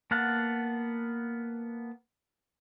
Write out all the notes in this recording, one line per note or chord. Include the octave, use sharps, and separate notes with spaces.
A#3 B3 F5 F#5 A5